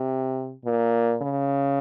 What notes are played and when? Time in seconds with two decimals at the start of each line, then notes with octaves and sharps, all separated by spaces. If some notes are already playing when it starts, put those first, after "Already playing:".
Already playing: C3
0.65 A#2
1.22 C#3